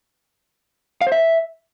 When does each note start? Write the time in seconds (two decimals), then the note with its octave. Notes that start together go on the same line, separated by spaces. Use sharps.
1.01 F5
1.07 C5
1.12 E5